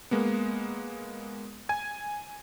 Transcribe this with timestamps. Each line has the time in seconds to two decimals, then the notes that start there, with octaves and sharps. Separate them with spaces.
0.11 G#3 A#3 B3
1.69 G#5 G#6